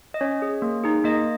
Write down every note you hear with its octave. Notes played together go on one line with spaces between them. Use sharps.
D#5
C#4 C#5
G#4
A#3
D#4 G#4
A#3 D#5